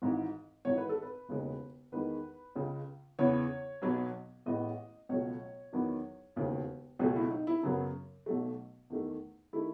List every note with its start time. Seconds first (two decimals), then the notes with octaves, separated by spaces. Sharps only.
0.02 G#1 G#2 E3
0.65 G#1 G#2 E3 C#5
0.77 B4
0.89 A4
1.02 B4
1.29 E1 D#2 C#3 G#3
1.92 E2 D#3 G#3 B4
2.56 C#2 C#3 G#3
3.19 E2 C#3 E3 B3 C#5
3.82 B1 B2 F#3 B3
4.46 A1 A2 G#3 B3 D#5
5.09 C#2 B2 F#3 A3 C#5
5.73 E2 D#3 F#3 B3
6.36 E1 D#2 C#3
6.99 C#2 B2 F#3 A3 G#4
7.16 E4
7.31 D#4
7.47 E4
7.63 F#2 C#3 F#3 B3
8.26 B1 B2 F#3 A3
8.90 E2 D#3 A3
9.53 D#3 A3 E4